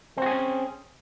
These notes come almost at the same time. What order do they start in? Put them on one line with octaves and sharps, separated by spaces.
C4 F#4 G#4 C#4